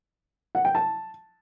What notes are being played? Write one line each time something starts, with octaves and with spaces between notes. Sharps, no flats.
F#5
G5
A5